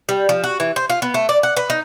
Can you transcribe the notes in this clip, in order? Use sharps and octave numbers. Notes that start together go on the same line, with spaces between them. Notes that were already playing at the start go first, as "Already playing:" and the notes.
G3
F3
F#4
E3
C5
F4
B3
A3
D5
F#5
B4
D#4